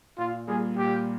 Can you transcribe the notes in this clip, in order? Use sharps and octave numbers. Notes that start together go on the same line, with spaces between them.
A#2 F4
G3 A#3 F4 G#4
A#2 G4